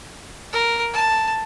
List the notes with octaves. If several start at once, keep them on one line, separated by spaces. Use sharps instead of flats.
A#4
A5